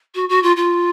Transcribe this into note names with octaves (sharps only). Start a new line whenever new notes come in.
F#4
F#4
F4
F4